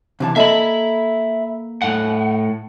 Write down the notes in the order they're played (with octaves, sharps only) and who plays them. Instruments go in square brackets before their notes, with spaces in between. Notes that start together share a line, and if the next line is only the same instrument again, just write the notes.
[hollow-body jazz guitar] C3 E3 A5
[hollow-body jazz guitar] A#3 A4 D#5 [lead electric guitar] E5 B5
[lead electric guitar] A2 F#5